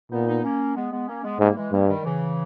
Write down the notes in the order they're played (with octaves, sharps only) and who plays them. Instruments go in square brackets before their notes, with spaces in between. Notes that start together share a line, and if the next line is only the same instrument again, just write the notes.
[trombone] A#2 [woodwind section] B3 D#4
[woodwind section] B3 D#4
A#3 C#4
G#3 B3
G#3 B3
A#3 C#4
G#3 B3
[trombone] G#2 [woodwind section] G3 A#3
[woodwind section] E3 G#3
[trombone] G2 [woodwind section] G3 A#3
[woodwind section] D#3 G3
C#3 E3